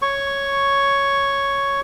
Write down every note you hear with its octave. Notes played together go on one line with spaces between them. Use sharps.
C#5 C#6